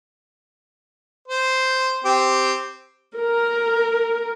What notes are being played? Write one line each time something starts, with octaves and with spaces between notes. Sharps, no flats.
C5
C4 G4
A#4